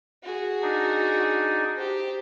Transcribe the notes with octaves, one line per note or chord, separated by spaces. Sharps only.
F#4 G#4
D4 D#4
G4 C5